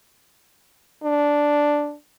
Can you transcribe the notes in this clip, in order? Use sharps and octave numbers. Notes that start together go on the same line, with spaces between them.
D4